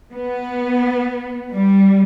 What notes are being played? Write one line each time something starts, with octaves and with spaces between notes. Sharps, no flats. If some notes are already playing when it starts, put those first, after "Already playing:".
B3
G3